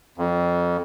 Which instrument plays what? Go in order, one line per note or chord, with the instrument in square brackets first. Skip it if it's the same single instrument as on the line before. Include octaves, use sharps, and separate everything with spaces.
[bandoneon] F2